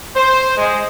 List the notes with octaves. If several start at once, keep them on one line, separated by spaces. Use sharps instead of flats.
C5
G#3